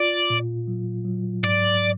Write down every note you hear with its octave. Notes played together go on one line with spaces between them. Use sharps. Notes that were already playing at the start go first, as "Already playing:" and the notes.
Already playing: F4 D5
A#2
F#3
F#3
G#2 D5